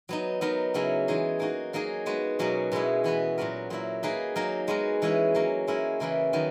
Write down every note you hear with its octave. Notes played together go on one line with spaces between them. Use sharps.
F#3 B3 D#4
F#3 B3 D#4 A#4
C#3 F#3 C#4 E4
E3 G#3 D#4 G#4
A#3 D#4 F#4
F#3 A#3 D#4 G#4
G#3 B3 F#4
B2 F#3 A#3 C#4 F#4
B2 G#3 B3 E4
E3 B3 F#4 B4
A#2 F#3 B3 F#4 A#4
A#2 F#3 A#3 E4
A#3 D#4 G#4 B4
F#3 A#3 D#4 A#4
G#3 B3 F#4 A#4
E3 G#3 C#4 E4 B4
F#3 A#3 C#4
G#3 C#4 E4 A#4
C#3 E3 A#3 E4 B4
D#3 F#3 B3